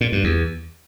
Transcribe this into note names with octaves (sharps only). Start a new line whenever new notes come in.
A#2
G2
E2